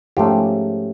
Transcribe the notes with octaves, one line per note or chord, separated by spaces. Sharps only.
G#2 F3 A3 C#4 F4 G4